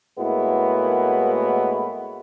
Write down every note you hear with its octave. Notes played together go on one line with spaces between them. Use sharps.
A2 G#3 A#3 B3 E4 F#4